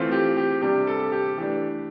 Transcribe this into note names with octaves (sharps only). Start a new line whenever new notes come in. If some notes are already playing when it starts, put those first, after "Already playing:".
Already playing: E3 A3 C4 F4
G4
G4
C3 G3 D4 G4
A4
G4
E3 A3 D4 G4